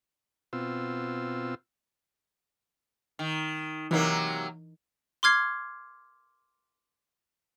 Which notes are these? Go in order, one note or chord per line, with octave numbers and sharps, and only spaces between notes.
B2 C4 F4 E6
D#3
C3 E3 F#3 A#3 D#4 A#4
C6 D6 F6 G#6 C7